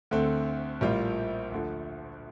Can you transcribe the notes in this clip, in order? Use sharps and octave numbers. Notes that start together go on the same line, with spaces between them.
D2 D3 A3 C4
A#1 A2 G3 A#3 F4
D2 D3 F3